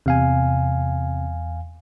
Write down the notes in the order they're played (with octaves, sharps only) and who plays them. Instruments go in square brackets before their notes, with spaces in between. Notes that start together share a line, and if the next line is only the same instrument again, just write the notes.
[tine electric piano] E2 F5 G#5 [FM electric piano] C3